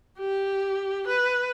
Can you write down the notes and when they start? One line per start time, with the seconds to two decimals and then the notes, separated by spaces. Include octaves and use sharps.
0.19 G4
1.07 B4